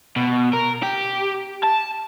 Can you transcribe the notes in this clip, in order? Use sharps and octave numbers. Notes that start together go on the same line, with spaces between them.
B2
A#4
G4
A5